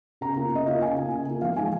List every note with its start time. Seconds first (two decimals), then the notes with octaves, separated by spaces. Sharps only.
0.21 C#3 A#5
0.37 A#3 F4
0.51 C#3 D#5
0.66 A#3 F4 F5
0.82 C#3 G#5
0.97 A#3 F4
1.12 C#3
1.27 A#3 F4
1.42 F3 F5
1.57 G#3 D#4 G#5